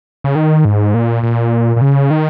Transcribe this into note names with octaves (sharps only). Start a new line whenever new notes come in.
C#3
D#3
G#2
A#2
A#2
A#2
C#3
D#3